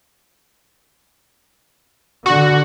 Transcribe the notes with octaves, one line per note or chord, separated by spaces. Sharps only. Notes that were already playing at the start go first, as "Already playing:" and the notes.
D3 F#4